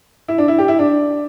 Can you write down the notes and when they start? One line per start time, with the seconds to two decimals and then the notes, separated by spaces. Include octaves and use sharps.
0.28 E4
0.38 D4
0.48 E4
0.58 G4
0.68 E4
0.79 D4